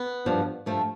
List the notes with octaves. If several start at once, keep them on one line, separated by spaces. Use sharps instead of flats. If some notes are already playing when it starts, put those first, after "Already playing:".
Already playing: B3
G2 F3
G2 F3 A3